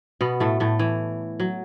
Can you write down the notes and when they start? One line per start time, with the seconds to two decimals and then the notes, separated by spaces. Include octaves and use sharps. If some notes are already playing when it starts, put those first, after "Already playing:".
0.21 B2 B3
0.40 A2 A3
0.60 A2 A3
0.79 E3
1.40 F#3